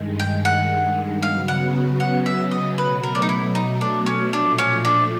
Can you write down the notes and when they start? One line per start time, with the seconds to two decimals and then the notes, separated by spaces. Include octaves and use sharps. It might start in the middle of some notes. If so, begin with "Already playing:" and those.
Already playing: G2 D#3 G#3
0.19 G5
0.45 F#5
1.23 C#3 F#3 B3 F5
1.48 F#5
2.00 F#5
2.26 E5
2.51 D#5
2.77 B2 F#3 A3 B4
3.03 A#4
3.15 D4
3.22 D#4
3.29 E4
3.55 D#4
3.81 D4
4.06 C#4
4.32 A#2 F3 A3 D4
4.58 C#4
4.85 D4